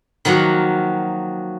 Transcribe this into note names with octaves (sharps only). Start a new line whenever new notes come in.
D#3 F3 F#3 A#3 F#4